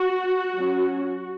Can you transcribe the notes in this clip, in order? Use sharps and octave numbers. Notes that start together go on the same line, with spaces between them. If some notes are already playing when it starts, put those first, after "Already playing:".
Already playing: F#4
F#3 C#4